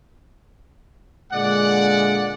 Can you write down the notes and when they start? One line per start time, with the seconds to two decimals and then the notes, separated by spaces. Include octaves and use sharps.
1.32 A#2 D3 G#3 D5 F#5